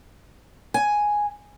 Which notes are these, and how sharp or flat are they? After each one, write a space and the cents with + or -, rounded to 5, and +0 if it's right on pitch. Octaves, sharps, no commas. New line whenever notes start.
G#5 +0